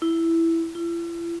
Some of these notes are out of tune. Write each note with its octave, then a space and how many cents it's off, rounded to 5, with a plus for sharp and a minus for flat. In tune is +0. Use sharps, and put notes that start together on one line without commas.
E4 +5
E4 +45